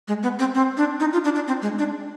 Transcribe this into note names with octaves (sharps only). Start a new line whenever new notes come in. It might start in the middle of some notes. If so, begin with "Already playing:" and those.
G#3
B3
C4
C4
D4
D#4
F4
D4
D4
C4
G#3
D4